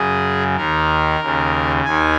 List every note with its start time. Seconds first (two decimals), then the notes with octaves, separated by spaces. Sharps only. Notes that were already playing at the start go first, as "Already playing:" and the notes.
Already playing: F#2 C#3 G#4
0.56 D#2 D#3 A#4
1.20 D#2 C#3
1.85 D#2 D#3 G#5